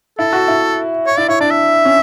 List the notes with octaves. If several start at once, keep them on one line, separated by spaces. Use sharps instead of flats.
E4 A4
F#4
E4
C#5
E4 D5
E4 C#5
D4 D5
E5
C#4